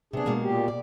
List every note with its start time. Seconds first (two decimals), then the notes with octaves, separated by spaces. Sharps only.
0.13 C3 B3 D4 G#4
0.26 B2 G#3 A#3
0.43 A#2 G4
0.68 D5